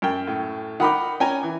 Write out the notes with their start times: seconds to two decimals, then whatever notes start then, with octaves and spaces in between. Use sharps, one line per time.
0.02 F#2 G5
0.27 A2
0.80 D#3 D#4 F#5 B5 D6
1.20 C#4 G5 G#5 A#5
1.43 E3